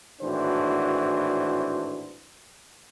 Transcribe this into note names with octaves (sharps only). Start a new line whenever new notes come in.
G#1 A2 E3 D4 F#4 C5